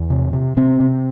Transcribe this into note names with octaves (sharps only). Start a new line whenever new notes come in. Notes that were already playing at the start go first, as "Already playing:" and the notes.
Already playing: E2
C3
C3
C3 C4
C3